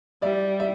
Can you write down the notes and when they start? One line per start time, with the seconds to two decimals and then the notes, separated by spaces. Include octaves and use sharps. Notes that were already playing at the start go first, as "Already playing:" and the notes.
0.22 G3 D5 E5
0.60 E5